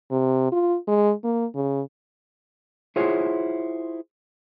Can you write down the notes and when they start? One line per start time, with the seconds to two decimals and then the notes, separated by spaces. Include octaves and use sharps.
0.11 C3
0.52 F4
0.87 G#3
1.24 A#3
1.55 C#3
2.96 E4 F4 G#4 C5 C#5 F#5